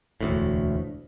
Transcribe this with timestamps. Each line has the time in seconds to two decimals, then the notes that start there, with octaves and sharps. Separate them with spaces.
0.21 E1 D2 A2